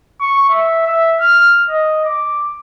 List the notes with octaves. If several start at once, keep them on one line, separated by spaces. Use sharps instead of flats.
C#6
E5
E5
F6
D#5
D6